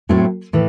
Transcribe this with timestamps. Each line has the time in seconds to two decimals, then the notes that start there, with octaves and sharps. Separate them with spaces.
0.09 A2 F#3 A3 C4
0.53 A2 E3